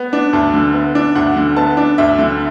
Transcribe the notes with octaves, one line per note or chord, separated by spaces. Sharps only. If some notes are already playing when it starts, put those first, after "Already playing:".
Already playing: B3
D4
D2 A5
D3
B3
D4
D2 F#5
D3
B3 A5
D4
D2 E5
D3